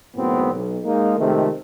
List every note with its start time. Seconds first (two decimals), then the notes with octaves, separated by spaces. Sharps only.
0.16 G#1 F#2 A2 C#3 B3 C4
0.53 B1
0.84 G#3 A#3 D#4
1.18 F2 C3 D#3 G#3 A3